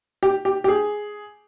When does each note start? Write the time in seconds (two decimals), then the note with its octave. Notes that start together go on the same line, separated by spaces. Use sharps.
0.23 G4
0.45 G4
0.64 G4
0.68 G#4